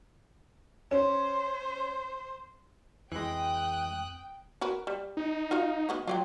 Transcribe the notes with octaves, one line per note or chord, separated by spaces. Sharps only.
C#4 C5
F2 E3 G#3 G5 D#6 F#6
F#4 A#4 B4
G3
D#4
F4 F#4 F5
D#3 B3 F#4
F#3 F4 D5 G5